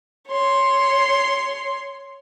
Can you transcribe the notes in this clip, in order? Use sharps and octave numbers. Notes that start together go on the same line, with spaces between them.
C#5 C6